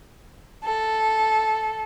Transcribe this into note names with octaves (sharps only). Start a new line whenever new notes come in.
A4